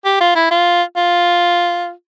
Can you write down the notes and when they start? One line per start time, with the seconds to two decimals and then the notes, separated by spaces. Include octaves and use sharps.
0.05 G4
0.21 F4
0.36 E4
0.51 F4
0.96 F4